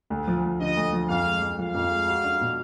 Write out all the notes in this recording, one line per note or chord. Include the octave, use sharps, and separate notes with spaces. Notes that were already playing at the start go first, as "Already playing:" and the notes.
D2
F3
D2
D3 D#5
D2
F3
F2 F5
G#3
F2
F3 F5
F2
G#3
F#4
D4
B2